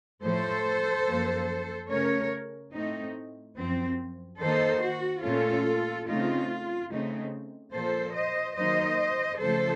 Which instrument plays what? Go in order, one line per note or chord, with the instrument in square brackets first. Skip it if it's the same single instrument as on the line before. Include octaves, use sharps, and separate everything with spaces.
[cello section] A2 F3 A3 A4 C5
F#2 F3 A#3
C#3 A3 C#4 A#4 C#5
A2 A3 C4 D#4
F#2 F3 C4
D#3 A#3 D#4 A4 C5
F#4
A#2 A3 C#4 F4 A4
C#3 A3 C4 D#4 F4
C#3 A3 C4 D#4
A#2 F3 A#3 A4 C5
C5 D#5
D#3 F#3 A#3 D#4 C5 D#5
C#3 F3 A3 A4 C5